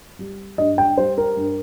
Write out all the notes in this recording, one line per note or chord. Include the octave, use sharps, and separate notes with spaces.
G3
G2 D#5
G5
G3 C5
A#4
G2